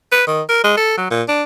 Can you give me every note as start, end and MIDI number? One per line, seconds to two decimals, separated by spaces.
0.12 0.26 71
0.27 0.42 51
0.49 0.61 70
0.64 0.75 56
0.77 0.96 69
0.97 1.09 54
1.10 1.23 46
1.29 1.44 62